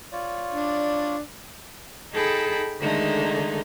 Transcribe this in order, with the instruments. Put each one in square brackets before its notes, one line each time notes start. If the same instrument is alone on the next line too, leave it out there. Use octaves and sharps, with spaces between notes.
[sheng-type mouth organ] F4 C#5 D5
[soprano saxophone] D4
[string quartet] D#4 G#4 A4 G5 A5 B5
D3 D#3 G#3 A3 D#4